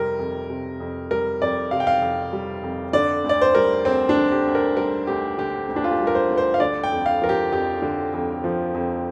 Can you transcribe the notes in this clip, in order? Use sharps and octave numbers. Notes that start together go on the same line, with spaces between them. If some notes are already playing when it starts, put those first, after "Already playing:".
Already playing: F2 C3 G3 A#4
F2
C3
F2
G3 A#4
F2 D5
C3 F5
G5
F5
F2
G3
F2
D3 D5
D2
D5
C5
G3 A#4
D2 C4
D4
D3
G4
D2
A#4
G3 A#4
D2 G4
D3 G4
D2
D4
F4
G4
G3
A#4
C5
D2
C5
F5
D3 D5
G5
F2
F5
F3 A#4
G4
F2 G4
D3
F2
F3
F2